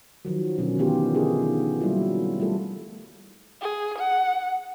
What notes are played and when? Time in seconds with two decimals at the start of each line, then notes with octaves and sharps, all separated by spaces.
0.25 D#3 F3 F#3
0.58 B2 D3 F#3 C#4
0.78 D#3 E3 B3 F4 G4
1.15 D3 B3 D#4 G4 G#4
1.80 F#3 G3 A#3 E4 F4
2.40 G3 A3 F4 A4
3.62 G#4
3.98 F#5